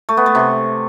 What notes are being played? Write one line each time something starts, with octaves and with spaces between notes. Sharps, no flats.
A3
B3
A3
C3